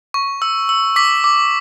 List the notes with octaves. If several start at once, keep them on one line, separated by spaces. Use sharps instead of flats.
C#6
E6
E6
D6 B6
D6